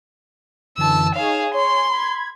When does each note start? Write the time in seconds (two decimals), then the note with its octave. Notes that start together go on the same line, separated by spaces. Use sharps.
0.78 F#2 D3 E3 A5 E6
1.15 D#4 G#4 C#5 F5 E7
1.54 C#5 G#5 C6
1.89 B5 G#6